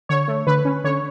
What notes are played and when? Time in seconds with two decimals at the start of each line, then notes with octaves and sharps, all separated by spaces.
0.09 D3 C#5
0.28 A3
0.47 D3 B4
0.65 C#4
0.84 D3 C#5